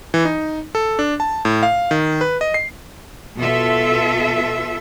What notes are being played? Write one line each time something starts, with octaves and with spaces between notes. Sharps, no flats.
E3
D#4
A4
D4
A5
A2
F5
D#3
B4
D#5
C7
B2 F4 A4 E5